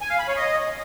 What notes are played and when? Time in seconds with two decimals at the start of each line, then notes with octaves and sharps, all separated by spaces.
0.01 G#5
0.10 F5
0.19 B5
0.28 C#5
0.37 D#5